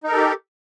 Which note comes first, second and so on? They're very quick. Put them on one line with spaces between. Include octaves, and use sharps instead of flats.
D#4 A#4 A4 G4